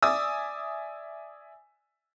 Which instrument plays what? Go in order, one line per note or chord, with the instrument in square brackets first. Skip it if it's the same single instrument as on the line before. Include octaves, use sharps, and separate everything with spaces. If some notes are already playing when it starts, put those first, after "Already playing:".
[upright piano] D5 E5 G#5 D#6 E6